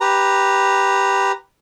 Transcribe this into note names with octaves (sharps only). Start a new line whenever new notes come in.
G4 B4 A#5